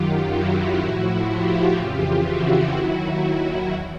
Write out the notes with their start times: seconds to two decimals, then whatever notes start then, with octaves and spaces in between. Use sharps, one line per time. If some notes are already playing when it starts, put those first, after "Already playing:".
Already playing: F#2 D#3 F#3 F4 G4
0.30 E4 F#4
0.79 A2 F3 E4 F#4
1.27 F4 G4
1.75 F2 C#3 E3 F4 G4
2.24 E4 F#4
2.72 D#2 D#3 F#3 E4 F#4
3.68 E2